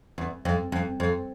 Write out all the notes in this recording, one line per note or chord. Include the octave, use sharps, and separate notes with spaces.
E2
F2
F2
F2